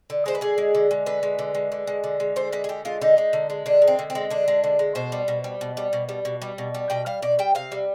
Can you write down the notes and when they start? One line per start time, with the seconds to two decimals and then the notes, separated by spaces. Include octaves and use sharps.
0.10 D3
0.26 G#3 C5
0.35 B4
0.41 D3 G#4
0.58 G#3
0.75 D3
0.91 G#3
1.06 D3 B4
1.23 G#3
1.39 D3
1.55 G#3
1.72 D3
1.87 G#3
2.04 D3
2.20 G#3
2.36 D3 C5
2.52 G#3 B4
2.64 G#4
2.69 D3 G4
2.85 G#3 F4
3.01 D3 D#4
3.18 G#3
3.33 D3
3.50 G#3
3.66 D3 D4
3.82 G#3
3.87 C4
3.99 D3
4.10 C4
4.15 G#3
4.30 D3 D4
4.48 G#3
4.64 D3
4.79 G#3
4.95 B2 C5
5.12 G3
5.28 B2
5.44 G3
5.61 B2
5.77 G3
5.93 B2
6.09 G3
6.25 B2
6.42 G3
6.58 B2
6.75 G3
6.90 B2 G5
7.06 G3 F5
7.22 B2 D5
7.39 G3 G5
7.55 C3 F5
7.72 G3